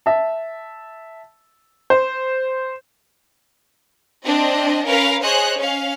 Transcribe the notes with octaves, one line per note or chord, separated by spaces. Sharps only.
E5 A5
C5
C4 D4 D#5
C#4 A#4 B4 F5
G#4 C5 C#5 D#5 F#6
C#4 F5